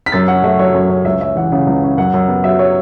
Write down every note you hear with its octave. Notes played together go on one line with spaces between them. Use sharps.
B6
F#2 A6
C#4 F#5
A3 E5
F#3 C#5
F#2
C#4
C#2 E5
C#4 E5
E3 F#5
C#3 F#5
C#2
C#4
F#2 F#5
F#2
B3
F#3 E5
C#5